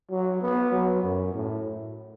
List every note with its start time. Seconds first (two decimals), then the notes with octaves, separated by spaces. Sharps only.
0.11 F#3
0.42 B3
0.72 F#3
1.03 F#2
1.34 A2